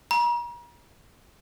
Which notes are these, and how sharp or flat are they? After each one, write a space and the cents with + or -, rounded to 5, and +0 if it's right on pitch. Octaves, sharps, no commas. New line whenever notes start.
A#5 +40